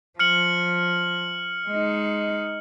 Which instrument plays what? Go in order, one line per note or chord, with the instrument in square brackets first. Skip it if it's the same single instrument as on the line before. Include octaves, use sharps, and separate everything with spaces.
[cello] F3 [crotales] F6 C#7 F#7
[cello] G#3 D#4